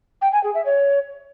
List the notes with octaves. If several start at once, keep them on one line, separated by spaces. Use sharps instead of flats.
G5
G#5
G#4
E5
C#5